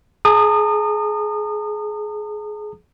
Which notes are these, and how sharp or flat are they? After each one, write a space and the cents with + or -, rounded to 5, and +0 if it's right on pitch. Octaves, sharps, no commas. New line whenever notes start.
G#4 +25 A#5 -45 D#6 -30